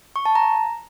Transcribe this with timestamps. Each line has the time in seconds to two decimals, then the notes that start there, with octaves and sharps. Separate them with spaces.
0.16 C#6
0.26 A5
0.35 A#5